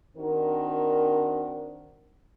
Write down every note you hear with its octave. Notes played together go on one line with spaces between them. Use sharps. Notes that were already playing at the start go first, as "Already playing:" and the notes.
D#3 C4 D4 F#4 A#4